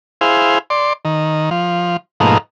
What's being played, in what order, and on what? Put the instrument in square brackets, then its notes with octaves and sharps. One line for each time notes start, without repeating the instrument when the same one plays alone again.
[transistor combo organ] E4 G#4 C5 F5
D5 C6
D#3
F3
G#2 B2 F3 A3 A#3 D#4